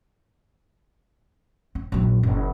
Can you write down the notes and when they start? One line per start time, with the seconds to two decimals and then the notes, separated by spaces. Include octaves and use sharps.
1.75 C4
1.92 A#1 F#3
2.23 F#1